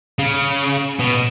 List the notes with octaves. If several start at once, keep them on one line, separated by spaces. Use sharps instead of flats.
C#3
B2